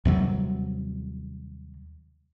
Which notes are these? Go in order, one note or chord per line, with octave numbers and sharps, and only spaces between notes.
D#2 C3 F#3 G3